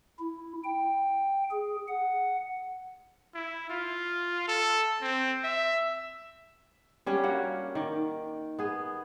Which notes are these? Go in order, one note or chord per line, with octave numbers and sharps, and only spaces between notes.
E4
G5
G#4
F#5
E4
F4
A4
C4
E5
G3 C#4 D4 F#5
A#3 F#4 F#5
D#3 D5
B3 G#4